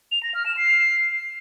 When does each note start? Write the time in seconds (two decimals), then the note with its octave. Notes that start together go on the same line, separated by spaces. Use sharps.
0.12 F7
0.23 A#6
0.34 F6
0.46 E7
0.57 C7